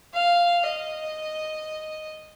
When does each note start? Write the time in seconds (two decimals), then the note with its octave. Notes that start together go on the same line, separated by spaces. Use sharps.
0.14 F5
0.67 D#5